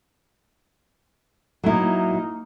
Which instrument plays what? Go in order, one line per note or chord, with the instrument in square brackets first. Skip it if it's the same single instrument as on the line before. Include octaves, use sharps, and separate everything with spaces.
[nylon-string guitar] F#3 E4 [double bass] A#3 D#4